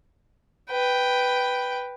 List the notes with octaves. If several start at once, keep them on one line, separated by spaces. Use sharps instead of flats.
B4 G5